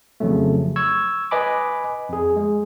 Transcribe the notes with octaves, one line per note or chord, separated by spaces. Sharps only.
F2 C#3 F3 F#3 A3
C#6 E6 G#6
B4 D#5 G#5 B5 D6
F2 G#4
G#3